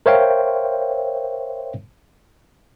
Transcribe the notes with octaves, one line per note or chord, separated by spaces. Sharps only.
A#4 C5 C#5 E5 F5 G5